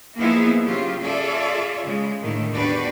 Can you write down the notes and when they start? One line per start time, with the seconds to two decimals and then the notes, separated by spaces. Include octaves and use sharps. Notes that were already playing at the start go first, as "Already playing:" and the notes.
0.18 F3 A#3 B3 D#4 E4 G#4
0.64 C#3 F#3 F4 G4
1.02 F4 G#4 A4 D5 E5
1.85 C#3 G#3
2.21 A2 D3 D#3
2.55 E2 D4 F#4 G4 B4 D5